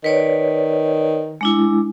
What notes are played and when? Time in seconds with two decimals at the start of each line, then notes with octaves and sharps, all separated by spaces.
0.04 D#3 B4 C#5 D5
1.41 G#3 D4 E4